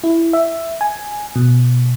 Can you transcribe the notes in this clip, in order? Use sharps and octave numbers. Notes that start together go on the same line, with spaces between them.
E4
E5
G#5
B2